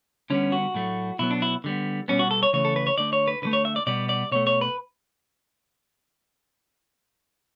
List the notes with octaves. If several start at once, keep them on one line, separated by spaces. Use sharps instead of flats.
D3 G3 B3 C#4
F#4
A2 F#3 A3
B2 F#3 B3 E4
D4
E4
D3 G3 B3
B2 G3 B3 C#4
F#4
A4
C#5
C#3 E3 A3 C#5
A4
B4
C#5
D3 A3 D5
C#5
B4
D3 F#3 A3 B4
C#5
E5
D5
B2 G3 B3 D5
D5
B2 A3 C#5
C#5
B4